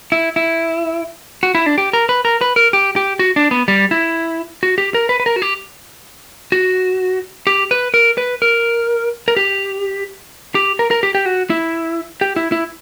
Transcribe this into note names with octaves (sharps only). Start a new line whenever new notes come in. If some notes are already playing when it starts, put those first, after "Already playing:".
E4
E4
F#4
E4
D4
G4
A#4
B4
A#4
B4
A#4
G4
G4
F#4
D4
B3
G3
E4
F#4
G4
A#4
B4
B4
A#4
F#4
G4
F#4
G4
B4
A#4
B4
A#4
A#4
G4
G4
A#4
A#4
G4
G4
F#4
E4
G4
E4
E4